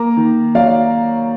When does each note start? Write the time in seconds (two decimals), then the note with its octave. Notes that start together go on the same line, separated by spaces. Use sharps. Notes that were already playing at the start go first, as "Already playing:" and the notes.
Already playing: A#3 A#5 D6
0.17 D#3
0.55 F#3 D5 F5
0.68 F5